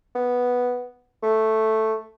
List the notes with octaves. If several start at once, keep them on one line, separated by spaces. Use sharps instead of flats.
B3
A3